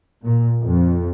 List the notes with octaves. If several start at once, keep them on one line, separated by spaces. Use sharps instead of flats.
A#2
F2